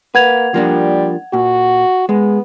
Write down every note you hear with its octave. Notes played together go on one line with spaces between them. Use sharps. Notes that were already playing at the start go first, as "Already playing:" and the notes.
A#3 B4 F#5 G#6 F7
F3 G3 A#3 D4
A#2 F#4
G#3 B3